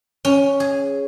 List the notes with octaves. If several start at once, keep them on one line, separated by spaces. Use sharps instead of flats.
C#4
G#4